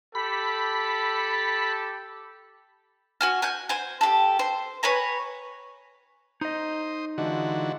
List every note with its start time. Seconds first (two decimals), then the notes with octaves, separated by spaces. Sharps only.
0.15 G4 A4 B5
3.21 F#4 G#5 F6
3.42 G#5 F#6 G6
3.69 C5 G#5
4.01 G4 A4
4.39 C5
4.83 B4 C#5 G#5 A#5
6.41 D#4 C5 D#5 D#6
7.18 D3 E3 G#3 D4 F4 F#4